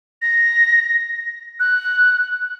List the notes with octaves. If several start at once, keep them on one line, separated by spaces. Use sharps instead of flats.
A#6
F#6